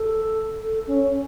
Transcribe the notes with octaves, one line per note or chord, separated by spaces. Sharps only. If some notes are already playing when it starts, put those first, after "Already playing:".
Already playing: A4
A4
C#4